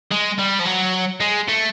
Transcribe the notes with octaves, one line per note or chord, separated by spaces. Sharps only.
G#3
G3
F3
F#3
G#3
A3